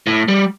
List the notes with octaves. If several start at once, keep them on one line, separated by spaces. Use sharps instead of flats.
A2
G3